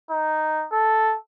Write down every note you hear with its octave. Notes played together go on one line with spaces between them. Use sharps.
D#4
A4